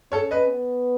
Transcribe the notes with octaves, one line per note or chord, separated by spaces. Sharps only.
C#4 A4 C#5
B4 D#5
B3